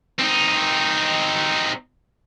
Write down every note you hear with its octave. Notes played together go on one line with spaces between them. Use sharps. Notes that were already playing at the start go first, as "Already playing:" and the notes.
C4 D#4